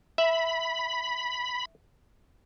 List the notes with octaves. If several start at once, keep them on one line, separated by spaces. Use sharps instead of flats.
E5 B5